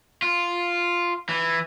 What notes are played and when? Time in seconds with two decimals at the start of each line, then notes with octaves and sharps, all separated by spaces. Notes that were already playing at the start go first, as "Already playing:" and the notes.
0.22 F4
1.29 E3